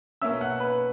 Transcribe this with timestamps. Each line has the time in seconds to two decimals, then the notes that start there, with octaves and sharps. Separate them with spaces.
0.22 B2 A#3 C#4 E5 E6
0.41 F#5 F#6
0.60 B4 B5